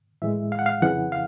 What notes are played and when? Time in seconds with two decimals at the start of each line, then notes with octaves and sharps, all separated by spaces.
0.22 A2 E3 G#3 E5
0.52 F5
0.59 F#5
0.66 F5
0.82 F2 C#3 E3 F#5
1.12 F5